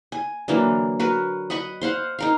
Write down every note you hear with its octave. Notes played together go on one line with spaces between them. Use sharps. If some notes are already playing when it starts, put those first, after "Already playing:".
G#5
D3 E3 F#3 A#3
F#4 A#4 B4
D#5 F#5 B5 C#6
C5 F5 F#5
D#4 A#4 F5